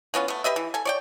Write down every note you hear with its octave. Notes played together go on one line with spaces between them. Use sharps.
E3 B3 C#4 F4
A3 B3
G4 B4 D#5 E5
E3
A4 G#5
C#5 D5 G5